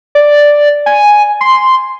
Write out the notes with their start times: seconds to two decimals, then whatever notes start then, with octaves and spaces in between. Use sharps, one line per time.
0.15 D5
0.86 G#5
1.41 C6